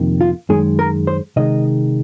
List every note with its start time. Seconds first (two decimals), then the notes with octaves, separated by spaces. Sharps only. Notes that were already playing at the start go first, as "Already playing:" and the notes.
Already playing: F2 C3 D#3 A#3
0.21 F4
0.49 F#2 D#3 G#3 G#4
0.79 A#4
1.07 C5
1.36 C3 D#3 G#3 D#5